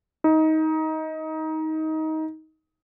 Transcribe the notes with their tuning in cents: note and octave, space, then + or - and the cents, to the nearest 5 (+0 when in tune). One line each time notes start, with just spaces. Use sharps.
D#4 +20